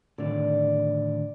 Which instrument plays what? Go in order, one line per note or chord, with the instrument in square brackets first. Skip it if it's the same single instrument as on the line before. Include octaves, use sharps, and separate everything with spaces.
[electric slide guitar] A2 D3 D#3 [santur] D5